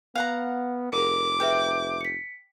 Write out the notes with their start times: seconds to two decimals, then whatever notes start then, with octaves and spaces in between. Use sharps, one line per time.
0.15 B3 F5 F#5 A#5
0.93 F1 G#4 A#4 D6
1.40 G#4 B4 E5 G5
2.01 B6 C#7